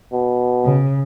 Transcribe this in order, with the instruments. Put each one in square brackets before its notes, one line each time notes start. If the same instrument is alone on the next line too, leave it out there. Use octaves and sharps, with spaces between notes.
[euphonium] B2
[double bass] C#3